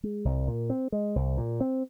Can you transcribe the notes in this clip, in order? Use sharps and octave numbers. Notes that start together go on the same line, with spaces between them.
G#3
C2
A#2
C4
G#3
C2
A#2
C4